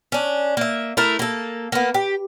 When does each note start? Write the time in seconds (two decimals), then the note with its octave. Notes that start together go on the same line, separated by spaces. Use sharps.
0.12 C#4 D4
0.57 A#3 E5
0.97 A3 E4 A4 A#4
1.19 A#3 A4
1.72 A#3 B3
1.94 G4